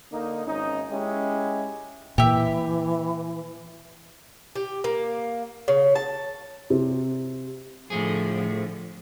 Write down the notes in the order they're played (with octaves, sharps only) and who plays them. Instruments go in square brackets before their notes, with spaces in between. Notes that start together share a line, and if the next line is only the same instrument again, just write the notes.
[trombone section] D3 A#3 D#4
G#1 C#4 D#4
G#3 C#4 E4 G4
[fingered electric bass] A#2 [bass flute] E3 [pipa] G4 E5
[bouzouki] G4
A#3
C#3
A5
[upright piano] C3
[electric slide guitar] A2 A3 G#4 [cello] D3 F3